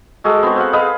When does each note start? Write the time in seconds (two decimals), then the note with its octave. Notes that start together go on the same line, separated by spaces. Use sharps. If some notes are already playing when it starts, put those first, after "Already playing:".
0.24 G#3 F#4 G#4 A4
0.43 B3 C4 F#4
0.56 C5 F5 F#5
0.73 G#4 B4 D#5 F5